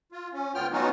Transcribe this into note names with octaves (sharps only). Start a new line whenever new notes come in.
F4
C#4
D2 B3 F4 G5 F6
F#3 B3 C#4 D#4 F4 F#4